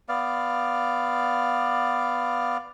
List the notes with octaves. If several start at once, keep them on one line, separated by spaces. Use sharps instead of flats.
B3 D5 F5